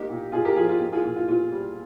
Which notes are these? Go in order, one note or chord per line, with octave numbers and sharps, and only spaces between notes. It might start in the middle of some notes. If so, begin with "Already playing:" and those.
Already playing: A#3 D#4 G4
A#2
A#2 F4 G#4
G4 A#4
F3 F4 G#4
F4
A#3
F4 G#4
A#2
F4
A#2 F4
G3